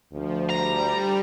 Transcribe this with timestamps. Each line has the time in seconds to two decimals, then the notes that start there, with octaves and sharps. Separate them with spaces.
0.12 D2 F3
0.50 G3 A#5